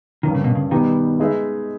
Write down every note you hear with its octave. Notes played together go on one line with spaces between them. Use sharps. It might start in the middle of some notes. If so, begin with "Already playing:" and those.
G2 D#3 G3 A#3 C#4
C#3
B2
C#3
B2 D#3 G3 B3 G4
G#3 D#4 G#4 B4 E5